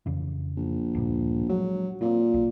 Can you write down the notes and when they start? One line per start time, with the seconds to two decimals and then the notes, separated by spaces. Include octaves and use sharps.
0.06 F2 C#3 E3
0.57 A#1
0.94 D2 G2 A#2
1.49 F3 F#3 G#3 A3
2.01 A#2 F#3 A#3 C4
2.34 B1